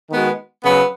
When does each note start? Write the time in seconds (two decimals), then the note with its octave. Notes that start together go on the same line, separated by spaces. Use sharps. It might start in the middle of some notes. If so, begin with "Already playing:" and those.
0.10 D#3 G#3 B3 F#4
0.64 C#3 F#3 B3